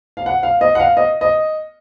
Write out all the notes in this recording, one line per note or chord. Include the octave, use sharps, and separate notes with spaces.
F5
F#5
F5
D#5
F#5
F5
D#5
D#5